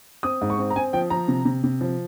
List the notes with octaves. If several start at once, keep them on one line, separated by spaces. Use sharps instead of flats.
C4 D#6
G#2
C#6
C4
A#5
C4 G#5
F3 G5
F3 A#5
C3
C3
C3
F3